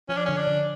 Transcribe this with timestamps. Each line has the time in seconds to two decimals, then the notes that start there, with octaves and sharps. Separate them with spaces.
0.09 F3 C#4
0.17 D4
0.25 D3 C#4
0.37 D4
0.47 D3